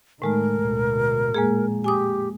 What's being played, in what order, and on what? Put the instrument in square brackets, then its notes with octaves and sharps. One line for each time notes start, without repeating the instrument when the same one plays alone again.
[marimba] A2 G#3 A3 [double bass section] D#3 [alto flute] A#4
[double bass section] D2 B2
[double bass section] F2 A#2 [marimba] G#3 A#3 G#4
[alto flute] G4 [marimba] G#5 D6 D#6